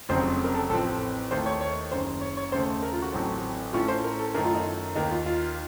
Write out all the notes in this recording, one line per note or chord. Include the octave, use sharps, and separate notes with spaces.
F1 F2 C#3 F#3 C4 C5
A#4
A4
A1 A2 F3 C4 A4
D#2 D#3 A3 D#4 C5
C#5
C#5
F#1 F#2 C#3 C5
C#5
C#5
D#2 C#3 A3 C5
A#4
F4
F#4
A1 A2 F#3 A3 C4
A2 A3 C#4 F4
C5
A#4
A4
F#2 D#3 A3 D#4 A#4
F4
D#4
D#2 D#3 A#3 D#4
F4
F4